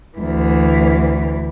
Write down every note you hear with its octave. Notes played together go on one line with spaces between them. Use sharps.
D2 E3